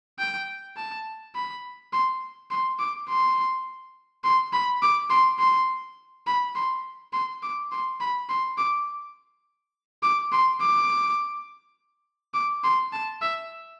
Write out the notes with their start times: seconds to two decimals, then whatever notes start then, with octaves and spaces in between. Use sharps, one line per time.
0.19 G5
0.77 A5
1.35 B5
1.93 C6
2.51 C6
2.79 D6
3.09 C6
4.24 C6
4.53 B5
4.83 D6
5.10 C6
5.39 C6
6.27 B5
6.56 C6
7.13 C6
7.43 D6
7.72 C6
8.01 B5
8.29 C6
8.58 D6
10.03 D6
10.32 C6
10.61 D6
12.34 D6
12.64 C6
12.93 A5
13.22 E5